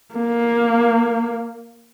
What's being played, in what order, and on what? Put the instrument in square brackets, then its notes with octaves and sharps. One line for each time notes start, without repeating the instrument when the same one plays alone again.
[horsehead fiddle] A#3